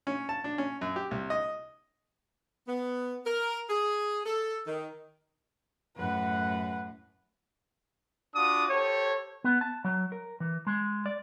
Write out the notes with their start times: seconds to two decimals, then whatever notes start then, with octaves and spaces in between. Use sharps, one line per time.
0.07 C#4
0.29 A5
0.44 D4
0.58 C#4
0.81 F#2
0.96 G4
1.11 C2
1.30 D#5
2.67 B3
3.26 A#4
3.69 G#4
4.24 A4
4.67 D#3
5.97 F#2 A2 B4 F#5
8.36 D4 F4 F#4 D6 D#6
8.70 G4 A4 C5 C#5
9.44 B3
9.61 A5
9.84 F#3
10.12 A#4
10.40 E3
10.67 G#3
11.06 D5